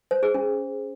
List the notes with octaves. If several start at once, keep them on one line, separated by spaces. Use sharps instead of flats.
C5
G#4
C#4